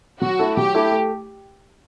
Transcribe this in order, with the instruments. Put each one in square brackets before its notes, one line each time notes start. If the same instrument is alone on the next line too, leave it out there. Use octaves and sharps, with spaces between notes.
[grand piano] F#3 [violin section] F#4
[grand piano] A3 E4 A4
[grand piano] F#3 [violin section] G4
[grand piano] A3 E4 A4
A3